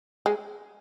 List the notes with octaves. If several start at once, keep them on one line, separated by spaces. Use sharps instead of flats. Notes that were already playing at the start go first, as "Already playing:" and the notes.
G#3